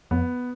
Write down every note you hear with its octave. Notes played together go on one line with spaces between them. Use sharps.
F2 B3